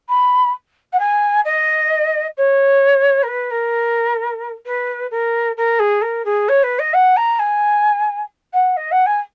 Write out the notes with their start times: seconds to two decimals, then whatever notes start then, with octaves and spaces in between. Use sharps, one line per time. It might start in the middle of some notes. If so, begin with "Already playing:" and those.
0.09 B5
0.93 F#5
1.00 G#5
1.45 D#5
2.37 C#5
3.23 A#4
3.28 B4
3.51 A#4
4.66 B4
5.11 A#4
5.57 A#4
5.79 G#4
6.02 A#4
6.25 G#4
6.49 C#5
6.63 B4
6.79 D#5
6.94 F#5
7.17 A#5
7.39 G#5
8.53 F#5
8.77 D#5
8.92 F#5
9.06 G#5